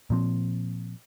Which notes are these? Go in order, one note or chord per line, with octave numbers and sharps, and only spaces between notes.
A#2 F3 C4